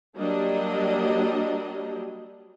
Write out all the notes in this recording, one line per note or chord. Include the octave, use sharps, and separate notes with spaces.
F#3 G3 A#3 D4 D#5